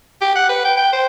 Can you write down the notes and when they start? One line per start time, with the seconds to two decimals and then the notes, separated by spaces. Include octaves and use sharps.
0.21 G4
0.35 F#5
0.49 B4
0.64 G5
0.76 G5
0.93 C5